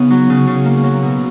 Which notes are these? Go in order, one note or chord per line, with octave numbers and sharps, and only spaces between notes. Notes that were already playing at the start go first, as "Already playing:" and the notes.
Already playing: C#3 B3 D#4
F#3
C#3
C#3
A#3
F#3
B2